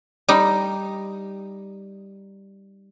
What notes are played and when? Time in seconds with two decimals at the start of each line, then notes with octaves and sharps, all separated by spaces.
0.29 G3 D#4